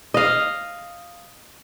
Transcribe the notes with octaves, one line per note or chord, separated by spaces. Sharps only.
D#5 F5